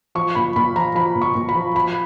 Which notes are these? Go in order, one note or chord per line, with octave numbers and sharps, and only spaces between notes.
F3 C#6
A#2 B5
A#2 B5
F3 A#5
F3 B5
A#2
C#6
A#2
B5
F3
F3 B5